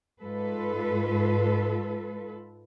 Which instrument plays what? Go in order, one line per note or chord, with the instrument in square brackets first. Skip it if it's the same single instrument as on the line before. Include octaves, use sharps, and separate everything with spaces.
[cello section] G#2 F4 A4 B4